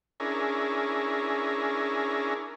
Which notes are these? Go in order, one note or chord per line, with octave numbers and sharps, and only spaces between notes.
C#4 D4 E4 G#4 A#4